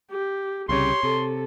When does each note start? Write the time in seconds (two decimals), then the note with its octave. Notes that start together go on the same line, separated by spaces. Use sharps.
0.11 G4
0.69 C2 C#3 G4 C#5 C6
1.03 C3 A4